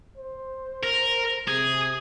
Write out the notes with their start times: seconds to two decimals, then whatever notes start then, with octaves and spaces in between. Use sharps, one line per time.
0.18 C5
0.83 A#4
1.48 C3 G#4